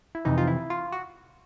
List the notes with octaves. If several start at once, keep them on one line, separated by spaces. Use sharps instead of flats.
E4
F2 C3 E3 D#4
F4
E4
F4
F#4